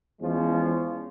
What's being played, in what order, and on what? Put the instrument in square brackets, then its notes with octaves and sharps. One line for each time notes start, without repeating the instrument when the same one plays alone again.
[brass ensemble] E2 F3 G#3 C#4